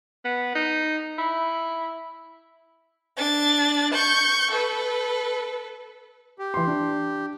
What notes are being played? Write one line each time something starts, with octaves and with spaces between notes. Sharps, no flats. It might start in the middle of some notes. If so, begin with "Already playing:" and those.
B3
D#4
E4
D4 A6
C#6 G6
A4 B4
G4
E3 C6
D4